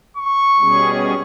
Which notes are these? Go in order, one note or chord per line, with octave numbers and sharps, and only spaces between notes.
C#6
B2 G3 C#4 G#4